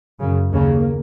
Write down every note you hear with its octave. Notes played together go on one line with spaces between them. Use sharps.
F#2 C#3
D#2 C#3 A#3